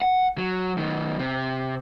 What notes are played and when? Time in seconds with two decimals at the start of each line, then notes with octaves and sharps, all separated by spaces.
0.02 F#5
0.38 F#3
0.77 F#2 D#3
1.19 C3